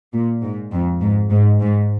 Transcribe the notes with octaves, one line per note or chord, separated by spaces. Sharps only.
A#2
G#2
F2
G#2
G#2
G#2